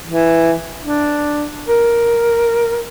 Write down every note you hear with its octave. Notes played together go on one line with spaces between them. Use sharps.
E3
D4
A#4